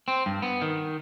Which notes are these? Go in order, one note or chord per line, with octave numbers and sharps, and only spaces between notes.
C4
G2
B3
D#3